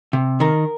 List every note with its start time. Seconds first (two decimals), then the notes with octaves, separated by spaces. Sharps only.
0.13 C3
0.40 D#3 A#4